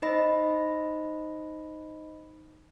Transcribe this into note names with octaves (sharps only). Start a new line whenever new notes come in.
D#4 C5 D#5 B5 A#6